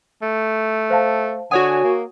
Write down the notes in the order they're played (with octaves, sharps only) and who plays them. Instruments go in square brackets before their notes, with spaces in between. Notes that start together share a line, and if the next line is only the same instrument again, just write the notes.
[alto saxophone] A3
[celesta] C5 F5 A5
[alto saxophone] D3 [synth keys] F#4 C#5 G#5 [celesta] F#5 D#6
[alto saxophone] A#3